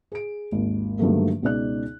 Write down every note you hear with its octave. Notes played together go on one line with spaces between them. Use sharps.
G#4 D7
G#1 D#2
G2 D3 D#3 F#3 A3 A#3
C#2 B2 D#4 D5 F#6